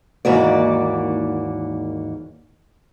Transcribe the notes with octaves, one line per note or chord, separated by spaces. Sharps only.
D#2 G#2 E3 A#3 F#4 D5